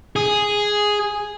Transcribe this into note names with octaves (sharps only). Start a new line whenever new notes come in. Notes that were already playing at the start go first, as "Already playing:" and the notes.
G#4